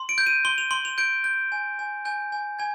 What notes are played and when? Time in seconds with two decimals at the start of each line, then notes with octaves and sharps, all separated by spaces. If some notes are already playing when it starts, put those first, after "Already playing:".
Already playing: C6
0.09 D7
0.18 G6
0.26 D#7
0.45 C6 G7
0.58 F7
0.71 C6 G7
0.85 F7
0.98 G6 D7
1.24 G6
1.52 G#5
1.79 G#5
2.05 G#5 G6
2.32 G#5
2.59 G#5 G#6